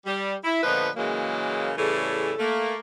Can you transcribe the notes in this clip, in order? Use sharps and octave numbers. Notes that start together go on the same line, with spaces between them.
G3
E4
A#2 D3 F3 B3 B4 D#5
C#3 E3 F#3 G#3 A#3
A2 C#3 E3 G3 G#4 A4
A3 A#3